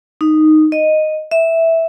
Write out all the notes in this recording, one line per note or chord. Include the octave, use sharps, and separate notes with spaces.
D#4
D#5
E5